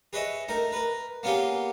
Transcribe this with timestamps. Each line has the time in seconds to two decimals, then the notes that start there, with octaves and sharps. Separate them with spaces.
0.13 G#4 B4 C#5 D#5 E5
0.48 A3 D#4 A#4
0.72 A#4 B4
1.23 A#3 B3 C#4 F4 G4 G#4